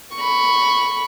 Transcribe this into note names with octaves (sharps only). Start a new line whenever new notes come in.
B5 C#6